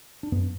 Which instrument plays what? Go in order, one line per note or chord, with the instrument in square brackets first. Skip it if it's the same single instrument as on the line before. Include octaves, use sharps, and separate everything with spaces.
[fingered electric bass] D4
F#2 B3